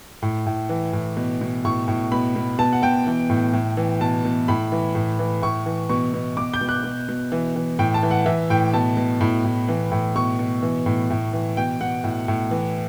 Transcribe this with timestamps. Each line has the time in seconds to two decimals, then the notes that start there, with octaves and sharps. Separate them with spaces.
0.22 A2
0.46 A2
0.69 E3
0.93 A2
1.17 B2
1.41 B2
1.65 A2 C#6
1.88 A2
2.12 B2 B5
2.36 B2
2.58 B2 A5
2.73 F#5
2.82 B2 G5
3.07 E3
3.30 A2
3.53 A2
3.77 E3
4.01 B2 A5
4.25 B2
4.48 A2 B5
4.72 E3
4.95 A2
5.19 E3
5.42 A2 C#6
5.66 E3
5.89 B2 C#6
6.13 B2
6.37 B2 D6
6.54 G6
6.61 B2
6.69 F#6
6.84 B2
7.08 B2
7.32 E3
7.56 E3
7.79 A2 G5
7.94 A5
8.03 E3
8.11 F#5
8.26 E3 E5
8.50 A2 G5
8.73 B2 A5
8.97 B2
9.21 A2 B5
9.44 A2
9.68 E3
9.92 A2
10.15 B2 C#6
10.39 B2
10.63 E3
10.86 A2
11.10 A2
11.33 E3
11.57 B2 G5
11.81 B2 F#5
12.04 A2
12.28 A2
12.51 E3